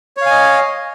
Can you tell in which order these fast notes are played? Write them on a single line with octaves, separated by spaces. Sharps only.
C#5 F5 G#5 D#5